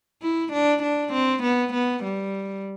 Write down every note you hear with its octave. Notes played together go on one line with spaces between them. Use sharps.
E4
D4
D4
C4
B3
B3
G3